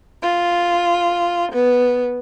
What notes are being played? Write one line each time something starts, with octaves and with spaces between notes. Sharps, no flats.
F4
B3